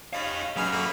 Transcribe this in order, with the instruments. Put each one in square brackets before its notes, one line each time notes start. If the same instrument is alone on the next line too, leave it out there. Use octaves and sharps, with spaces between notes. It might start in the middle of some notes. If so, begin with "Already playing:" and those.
[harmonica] C#4 D#4 [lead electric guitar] G4 F5
[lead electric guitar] F#3 C#4 [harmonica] G#4 B4 F6
[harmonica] A3 A#3 B4